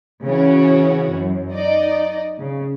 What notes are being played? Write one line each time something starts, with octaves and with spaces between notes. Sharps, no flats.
C#3 E3 C#4 F#4
F#2
D#4 D5 D#5
C#3